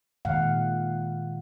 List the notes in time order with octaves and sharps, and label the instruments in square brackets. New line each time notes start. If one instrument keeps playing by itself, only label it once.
[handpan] A#2 D#3 G#3 F5 F#5